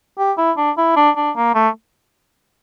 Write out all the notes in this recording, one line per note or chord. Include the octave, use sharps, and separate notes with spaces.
G4
E4
D4
E4
D4
D4
A#3
A3